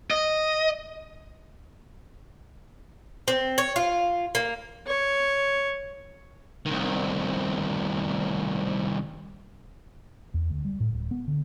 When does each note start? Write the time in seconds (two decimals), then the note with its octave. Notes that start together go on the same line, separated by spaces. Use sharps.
0.11 D#5
3.28 C4
3.58 C#5
3.76 F4
4.35 A#3
4.87 C#5
6.66 C2 D#3
10.34 E2
10.50 D2
10.65 G3
10.80 A2
10.93 D1
11.11 B3
11.27 D3